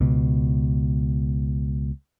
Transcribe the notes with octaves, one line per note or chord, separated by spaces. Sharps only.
C#2 B2